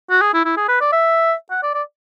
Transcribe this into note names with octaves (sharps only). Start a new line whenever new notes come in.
F#4
G#4
E4
E4
G#4
B4
D5
E5
F#5
D5
D5